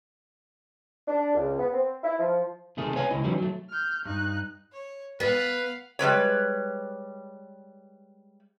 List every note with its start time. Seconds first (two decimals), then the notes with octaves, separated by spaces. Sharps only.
1.08 D4
1.35 C#2
1.58 B3
1.72 C4
2.03 E4
2.18 F3
2.77 C3 D#3 A3 G#4
2.96 B4 C#5 F5 G#5
3.11 C#2 E4 D#5
3.24 D#3 E3 F#3 G3 C#4
3.38 F#3 A3
3.69 F6 G6
4.06 G2 D#4 F#6
4.72 C#5
5.20 B3 B4 F5 F#5
5.99 G3 G#3 B4 C#5